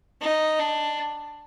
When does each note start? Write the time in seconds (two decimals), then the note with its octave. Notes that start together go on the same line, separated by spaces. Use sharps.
0.21 D#4
0.59 D4